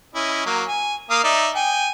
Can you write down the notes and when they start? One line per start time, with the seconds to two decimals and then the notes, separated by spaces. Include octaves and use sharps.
0.15 C#4 E4 D#5
0.46 F#3 A#3
0.68 G#5
1.10 A#3 F5 D#6
1.24 D#4 D5 E5
1.55 G5 G#5